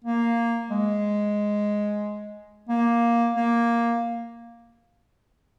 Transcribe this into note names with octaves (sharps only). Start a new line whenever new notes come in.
A#3
G#3
A#3
A#3